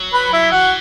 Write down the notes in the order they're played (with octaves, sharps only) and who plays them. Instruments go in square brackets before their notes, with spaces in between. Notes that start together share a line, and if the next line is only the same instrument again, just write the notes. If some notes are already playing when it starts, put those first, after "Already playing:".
Already playing: [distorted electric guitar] F#3
[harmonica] B4 B5
E4 E5
[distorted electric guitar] E3 [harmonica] F#4 F#5